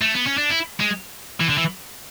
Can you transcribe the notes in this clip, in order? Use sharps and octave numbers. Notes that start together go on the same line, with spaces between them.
A3
B3
C#4
D4
E4
G#3
E3
D3
E3